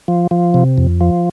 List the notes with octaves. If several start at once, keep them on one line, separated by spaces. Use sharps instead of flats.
F3
F3
C3
F2
F3